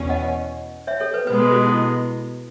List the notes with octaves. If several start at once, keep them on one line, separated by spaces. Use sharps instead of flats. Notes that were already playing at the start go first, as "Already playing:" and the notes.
Already playing: E2 B2 C#4
D#5 F#5
C#5 E5
A4 C#5
B4
B2 G#3 B3 B4
A4
F#4
E4